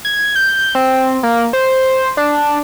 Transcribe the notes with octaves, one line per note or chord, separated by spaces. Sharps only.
G#6
G6
C4
A#3
C5
D4